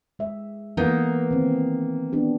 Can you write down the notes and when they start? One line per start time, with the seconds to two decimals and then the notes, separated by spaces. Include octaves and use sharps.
0.19 G#3 E5
0.77 E3 A#3 B3 D#4 A4
1.31 D#3 C4
2.12 B3 D4 G4